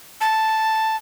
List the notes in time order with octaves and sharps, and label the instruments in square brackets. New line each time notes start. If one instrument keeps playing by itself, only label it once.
[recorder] A5